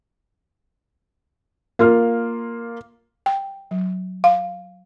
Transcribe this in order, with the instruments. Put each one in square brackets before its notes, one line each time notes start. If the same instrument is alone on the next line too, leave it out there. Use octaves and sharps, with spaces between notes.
[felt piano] A#3 F4 F6
[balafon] G5
F#3
F5